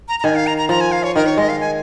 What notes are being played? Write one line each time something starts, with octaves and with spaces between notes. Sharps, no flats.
A#5
A#5
D#3 G#5
F5
A#5
A#5
F3 A#5
G#5
F5
C#5
D#3 A#4
C#5
G#3 D#5
F5
G#5